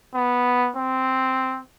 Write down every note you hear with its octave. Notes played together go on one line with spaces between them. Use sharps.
B3
C4